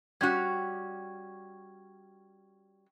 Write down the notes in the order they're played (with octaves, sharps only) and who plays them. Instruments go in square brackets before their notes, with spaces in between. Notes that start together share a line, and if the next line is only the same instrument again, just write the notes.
[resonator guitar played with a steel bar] G3 C#4 F#4 [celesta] G5 C#6 G#6